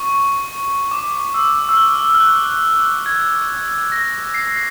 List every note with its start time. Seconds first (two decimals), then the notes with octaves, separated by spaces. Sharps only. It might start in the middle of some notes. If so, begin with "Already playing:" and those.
Already playing: C#6
0.91 D6
1.34 E6
1.69 E6
1.77 F6
2.14 F6
2.20 F#6
3.06 G#6
3.92 A#6
4.34 C7